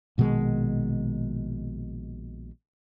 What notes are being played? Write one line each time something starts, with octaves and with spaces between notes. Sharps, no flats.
A#1 B2 D#3 G#3